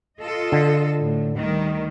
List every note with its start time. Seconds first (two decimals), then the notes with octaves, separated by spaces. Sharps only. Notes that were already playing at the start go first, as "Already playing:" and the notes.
0.19 F4 A4 D#5
0.52 D3
1.02 A2
1.37 D2 D#3 G3